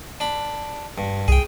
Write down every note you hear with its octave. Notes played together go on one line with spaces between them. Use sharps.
D4 B5
G2
C2 G#4 G5